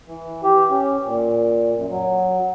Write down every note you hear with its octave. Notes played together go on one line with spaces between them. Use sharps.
E3
G4
C#4
A#2
F#2
F#3